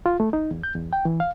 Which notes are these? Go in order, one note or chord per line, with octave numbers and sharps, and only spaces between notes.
F4
A3
D#4
E2
G6
E2
G5
E3
F5